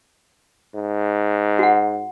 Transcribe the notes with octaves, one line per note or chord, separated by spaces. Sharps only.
G#2
F#4 F#5